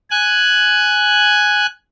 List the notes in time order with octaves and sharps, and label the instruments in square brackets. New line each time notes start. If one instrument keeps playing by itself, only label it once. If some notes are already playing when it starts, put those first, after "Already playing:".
[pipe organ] G#5 F#6